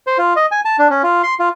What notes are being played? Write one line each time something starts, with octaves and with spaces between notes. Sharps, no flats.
C5
F4
D#5
G#5
A5
D4
C#4
F4
C6
F4